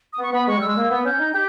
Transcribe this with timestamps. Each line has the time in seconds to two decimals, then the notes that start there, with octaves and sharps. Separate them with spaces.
0.13 D#6
0.19 B3 C#6
0.33 B3 B5
0.48 G#3 C#6
0.57 G3
0.61 E6
0.67 G#3
0.77 A#3
0.90 B3
1.05 C#4 G6
1.19 D#4
1.34 G4 G6